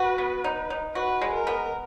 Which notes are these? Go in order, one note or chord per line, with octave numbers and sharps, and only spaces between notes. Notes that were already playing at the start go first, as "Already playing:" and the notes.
Already playing: F#4 B4
B3
D#4
D#4
F#4 B4
G#3
A#4
B3